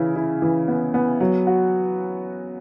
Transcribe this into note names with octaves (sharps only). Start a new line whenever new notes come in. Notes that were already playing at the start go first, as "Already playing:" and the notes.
Already playing: C#3 E3 E4
E4
E3
B3
B3
F#3
F#4